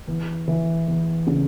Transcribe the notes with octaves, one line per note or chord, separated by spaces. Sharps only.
E2
E3
E2
C#3